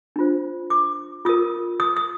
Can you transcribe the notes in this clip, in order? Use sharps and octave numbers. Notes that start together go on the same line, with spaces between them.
D4 F4 C5
D6
F4 A#4 D#6
D#6
D#6